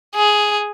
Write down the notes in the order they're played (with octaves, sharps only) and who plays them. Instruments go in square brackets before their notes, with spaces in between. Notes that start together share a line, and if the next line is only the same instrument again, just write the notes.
[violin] G#4